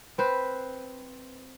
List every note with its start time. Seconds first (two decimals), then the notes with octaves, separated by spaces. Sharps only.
0.18 C4 B4 C5